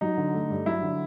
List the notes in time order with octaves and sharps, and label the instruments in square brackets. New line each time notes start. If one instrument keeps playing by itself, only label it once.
[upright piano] F#3 D#4
D3
A3
G2
F#3 E4
D3